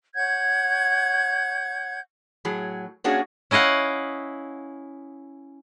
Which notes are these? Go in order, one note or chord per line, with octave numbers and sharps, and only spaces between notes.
C#5 F#5 G6 G#6
A2 F#3 G#4
A#3 C#4 D4 F#4 G#4 C#5
C#4 E4 D#5 F5 F#5